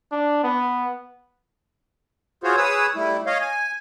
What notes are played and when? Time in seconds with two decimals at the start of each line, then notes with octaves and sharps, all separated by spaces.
0.12 D4
0.44 B3
2.43 F4 F#4 G#4 C5 C#5
2.57 G#4 B4 C#5 D#6 E6
2.96 G3 A3 E4
3.26 C#5 D#5 F5
3.41 G#5